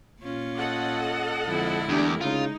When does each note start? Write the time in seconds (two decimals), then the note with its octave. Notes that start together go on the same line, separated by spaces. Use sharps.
0.23 A#2 C#4 F4
0.55 A4 D#5 F#5
1.47 F2 D3 G#3 E4
1.89 E2 A3 D4 G4 A#4
2.21 C#3 G#3 D#4 F4